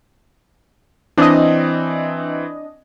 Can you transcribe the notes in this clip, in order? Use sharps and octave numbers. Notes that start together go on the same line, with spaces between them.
E3 C4 D4 D#5